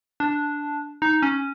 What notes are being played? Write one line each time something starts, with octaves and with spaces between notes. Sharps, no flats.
D4
D#4
C#4